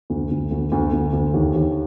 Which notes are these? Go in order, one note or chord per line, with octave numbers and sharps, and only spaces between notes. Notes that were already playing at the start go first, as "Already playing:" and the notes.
D2
D2
D2
D2
D2
D2
D#2
D#2